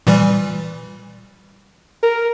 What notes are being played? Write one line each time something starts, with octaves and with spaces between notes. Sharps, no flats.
A#2 E3 G3
A#4